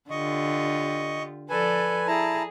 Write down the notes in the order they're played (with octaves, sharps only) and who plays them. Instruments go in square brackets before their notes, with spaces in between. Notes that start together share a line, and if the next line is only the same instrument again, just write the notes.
[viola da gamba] D3 F4 G4 [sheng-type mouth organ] D#5 C#6
[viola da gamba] F3 A4 D5 [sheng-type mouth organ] B4 G#5
[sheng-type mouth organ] E4 A5 A#5 [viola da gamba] G#4